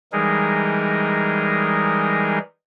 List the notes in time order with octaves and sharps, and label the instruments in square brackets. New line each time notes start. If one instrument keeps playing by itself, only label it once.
[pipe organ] E3 G3 G#3 D#4 G#4 A#4